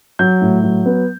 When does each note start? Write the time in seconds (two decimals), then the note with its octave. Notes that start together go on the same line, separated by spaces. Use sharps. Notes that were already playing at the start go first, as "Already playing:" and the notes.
0.19 F#3 G6
0.42 A2
0.64 F#3
0.86 B3